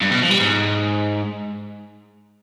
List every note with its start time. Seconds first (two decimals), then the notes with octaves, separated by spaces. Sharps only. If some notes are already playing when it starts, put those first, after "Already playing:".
0.02 G2
0.12 B2
0.22 F3
0.31 G3
0.40 G#2